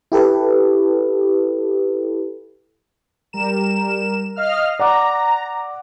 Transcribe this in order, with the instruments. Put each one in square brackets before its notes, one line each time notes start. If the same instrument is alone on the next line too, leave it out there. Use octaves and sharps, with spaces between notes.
[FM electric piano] E4 G4 A4 B4
[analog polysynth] G3 A#4 E7
D#5 F5 F6
[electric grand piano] D5 F#5 D6 [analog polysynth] A#5